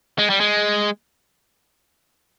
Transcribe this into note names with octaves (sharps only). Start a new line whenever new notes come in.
G#3
G3
G#3